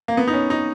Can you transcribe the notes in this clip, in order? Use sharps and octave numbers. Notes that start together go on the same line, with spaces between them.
A#3
B3
D#4
C#4
D#4